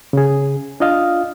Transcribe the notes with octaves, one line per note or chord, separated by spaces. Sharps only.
C#3 G#4
D4 F4 D#5 F5